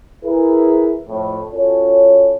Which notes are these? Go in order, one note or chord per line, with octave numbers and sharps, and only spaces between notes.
E4 G#4 A#4 B4
F2 A2
C#4 F4 F#4 A4 C#5